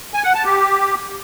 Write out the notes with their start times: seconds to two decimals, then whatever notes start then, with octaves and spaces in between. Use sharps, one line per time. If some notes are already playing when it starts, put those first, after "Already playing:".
0.14 G#5
0.24 F#5
0.34 A5
0.44 G4